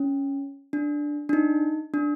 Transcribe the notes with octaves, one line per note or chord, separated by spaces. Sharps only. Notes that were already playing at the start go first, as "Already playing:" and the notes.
Already playing: C#4
D4
D4
D#4
D4